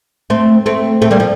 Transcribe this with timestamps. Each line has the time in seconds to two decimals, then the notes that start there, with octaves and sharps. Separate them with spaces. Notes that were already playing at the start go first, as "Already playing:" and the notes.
0.30 A3 C4
0.66 A3 C4
1.02 A3 C4
1.11 G3 A#3
1.20 F3